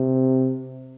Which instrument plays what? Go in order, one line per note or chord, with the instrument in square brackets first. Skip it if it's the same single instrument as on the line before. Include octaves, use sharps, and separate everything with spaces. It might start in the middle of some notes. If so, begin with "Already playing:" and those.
Already playing: [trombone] C3